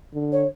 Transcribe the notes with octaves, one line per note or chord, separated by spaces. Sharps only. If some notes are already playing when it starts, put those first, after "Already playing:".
D3
C#5